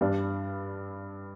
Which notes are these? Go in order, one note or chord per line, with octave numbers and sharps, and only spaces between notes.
G2 G3 D4